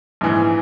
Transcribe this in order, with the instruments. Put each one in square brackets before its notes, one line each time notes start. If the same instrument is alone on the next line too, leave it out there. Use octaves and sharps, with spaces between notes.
[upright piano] A#1 G#2 E3